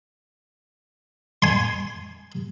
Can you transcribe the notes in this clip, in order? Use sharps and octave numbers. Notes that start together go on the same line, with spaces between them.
G#5 C6